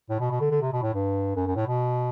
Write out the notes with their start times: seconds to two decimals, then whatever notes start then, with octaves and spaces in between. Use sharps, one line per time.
0.10 A2
0.20 B2
0.31 B2
0.40 D3
0.51 D3
0.62 C3
0.73 B2
0.82 A2
0.94 G2
1.36 F#2
1.46 F#2
1.56 A2
1.67 B2